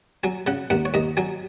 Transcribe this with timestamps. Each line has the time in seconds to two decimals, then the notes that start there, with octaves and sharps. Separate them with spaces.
0.23 F#3 G#5
0.47 C#3 F#5
0.70 D#2 F#5
0.85 C#5
0.94 D#2 D#5
1.17 F#3 G#5